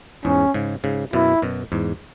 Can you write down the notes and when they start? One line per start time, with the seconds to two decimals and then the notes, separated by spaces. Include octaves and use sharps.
0.25 E2 G#2 C#4
0.54 G#2 C#3
0.84 G#2 C#3
1.13 F#2 B2 E4
1.42 F#2 B2
1.72 E2 G#2